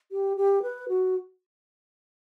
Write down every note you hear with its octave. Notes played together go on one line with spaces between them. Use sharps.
G4
G4
B4
F#4